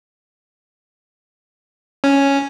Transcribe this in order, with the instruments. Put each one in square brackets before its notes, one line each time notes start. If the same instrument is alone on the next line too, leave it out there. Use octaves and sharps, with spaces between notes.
[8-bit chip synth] C#4